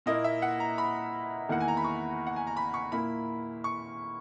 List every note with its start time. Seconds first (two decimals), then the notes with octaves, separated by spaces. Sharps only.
0.06 A#2 A#3 E4 D#5
0.24 E5
0.42 F#5
0.60 A#5
0.78 B5
1.49 E2 D#3 A#3 E4 F#5
1.61 G#5
1.68 A#5
1.77 B5
1.84 C#6
2.27 F#5
2.36 G#5
2.47 A#5
2.57 B5
2.74 C#6
2.92 A#2 A#3 E4 B5
3.64 C#6